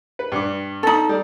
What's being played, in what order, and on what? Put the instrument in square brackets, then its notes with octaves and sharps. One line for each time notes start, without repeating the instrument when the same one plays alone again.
[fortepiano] B4
G2 D6
[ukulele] D#4 A4
[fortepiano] G3